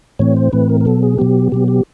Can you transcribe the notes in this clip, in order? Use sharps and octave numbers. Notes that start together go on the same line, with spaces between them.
A2 E3 A3 C4 C#5
C5
A2 E3 A3 C4 B4
A#4
A#4
B2 F#3 B3 A4
G#4
B2 F#3 B3 G4
B2 F#3 B3 G4
G4